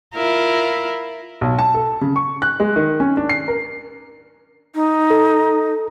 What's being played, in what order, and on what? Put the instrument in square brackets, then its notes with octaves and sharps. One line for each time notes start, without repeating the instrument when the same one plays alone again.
[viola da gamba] E4 F4 A#4
[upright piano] B1
A5
A4
C#3
C#6
F#6
G#3
D#3
C#4
D4
C7
A#4
[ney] D#4
[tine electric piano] A4